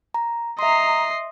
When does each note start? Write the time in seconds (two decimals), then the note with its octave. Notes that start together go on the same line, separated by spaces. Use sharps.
0.14 A#5
0.59 D#5 E5 A#5 C6 C7